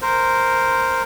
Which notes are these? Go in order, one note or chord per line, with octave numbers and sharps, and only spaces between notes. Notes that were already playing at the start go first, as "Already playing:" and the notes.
A#4 C5